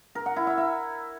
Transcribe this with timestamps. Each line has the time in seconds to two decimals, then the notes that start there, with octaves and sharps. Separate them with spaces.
0.15 A#4
0.26 F#5
0.36 E4
0.47 E5
0.58 E5